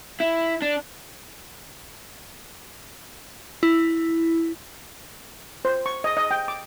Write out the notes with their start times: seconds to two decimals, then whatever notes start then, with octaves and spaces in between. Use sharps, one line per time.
0.20 E4
0.62 D4
3.63 E4
5.65 C5
5.86 C#6
6.04 D#5
6.17 D#5
6.31 G5
6.48 D6